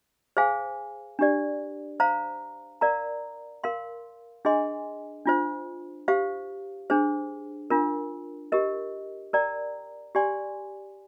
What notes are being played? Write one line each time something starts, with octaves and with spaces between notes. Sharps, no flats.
G#4 C5 F5 G#5
D4 G4 D5
C5 F5 A#5
A#4 D5 F5 A#5
A#4 F5 C6
D4 G#4 D#5 G#5 C6
D4 F4 C5
G4 C5 F5
D4 G#4 C5
D4 F4 A#4
G4 A#4 D#5
A#4 D5 G5 A#5
G4 D5 G#5 C6